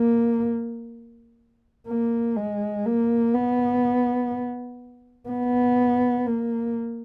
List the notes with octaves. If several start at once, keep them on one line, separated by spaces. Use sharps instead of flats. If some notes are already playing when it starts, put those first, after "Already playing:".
Already playing: A#3
A#3
G#3
A#3
B3
B3
A#3